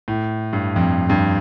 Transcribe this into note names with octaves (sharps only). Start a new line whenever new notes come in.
A2
G2
F2
G2